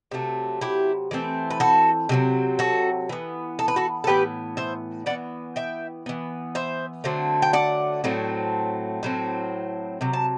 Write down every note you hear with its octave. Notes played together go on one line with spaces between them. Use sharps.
C3 F#3 A3
E4 G4
E3 A3 C4
B4
F#4 A4
C3 F#3 C4
F#4 A4
E3 B3
A4
B4
F#4 A4
A4
A2 E3 B3 G4 B4
C5 E5
E3 B3 D5 F#5
E5 G5
E3 B3
C5 E5
D3 F#3 A3 C4
G5
D5 F#5
A2 F#3 A3 C4
A2 F#3 C4
C3 F#3
A5